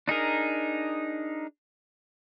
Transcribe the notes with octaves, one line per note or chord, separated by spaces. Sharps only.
D4 D#4 G#4 A#4